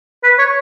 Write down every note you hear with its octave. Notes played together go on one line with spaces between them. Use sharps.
B4
C#5